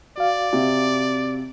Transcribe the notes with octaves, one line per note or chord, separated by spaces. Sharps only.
F#4 D5 F5
C3